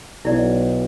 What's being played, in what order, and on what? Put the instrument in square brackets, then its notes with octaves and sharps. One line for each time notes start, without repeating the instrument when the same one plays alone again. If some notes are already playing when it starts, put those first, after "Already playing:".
[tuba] B1 [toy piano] E4 D5